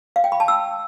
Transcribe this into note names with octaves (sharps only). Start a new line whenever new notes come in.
F5
G5
B5
A5
E6